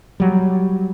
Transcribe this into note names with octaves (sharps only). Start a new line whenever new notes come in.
F#3 G3